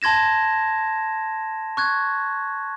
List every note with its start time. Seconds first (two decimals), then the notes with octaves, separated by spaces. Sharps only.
0.02 A5 C6 G#6 A#6 E7
1.77 C#6 F#6 G#6